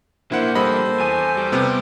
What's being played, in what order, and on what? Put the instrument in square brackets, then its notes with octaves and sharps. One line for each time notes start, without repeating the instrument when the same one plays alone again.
[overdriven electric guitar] A#3 D4 [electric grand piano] E4 F#5 [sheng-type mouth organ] C5
[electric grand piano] G3 D#5 B5 [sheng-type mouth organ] A4 C5
[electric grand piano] E2 D#7 [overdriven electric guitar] G#5
[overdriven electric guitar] G3
[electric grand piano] C3 B3 C4